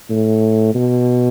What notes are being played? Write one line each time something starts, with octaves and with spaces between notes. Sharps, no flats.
A2
B2